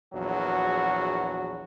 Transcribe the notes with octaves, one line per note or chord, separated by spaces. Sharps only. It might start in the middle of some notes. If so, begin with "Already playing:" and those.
A#1 E2 F#3 F#4